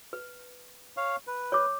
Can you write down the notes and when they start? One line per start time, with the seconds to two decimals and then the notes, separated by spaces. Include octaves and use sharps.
0.13 B4
0.97 C#5 F5
1.27 B4
1.52 C#5 D6